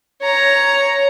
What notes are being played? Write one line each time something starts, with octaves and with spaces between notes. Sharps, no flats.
C#5 A#5